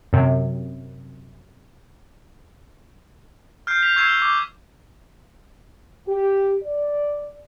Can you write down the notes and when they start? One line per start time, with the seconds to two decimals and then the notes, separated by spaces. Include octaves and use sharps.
0.13 F#2 C3
3.67 F6 G6 C7
3.82 G6 B6 F7
3.96 C#6 E6 G#6 C7 E7
4.08 G7
4.22 D6
6.07 G4
6.63 D5